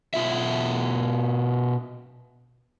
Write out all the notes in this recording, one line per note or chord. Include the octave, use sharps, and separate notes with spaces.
B2 F4 E5